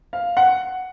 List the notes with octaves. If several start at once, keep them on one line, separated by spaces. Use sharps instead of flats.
F5
F#5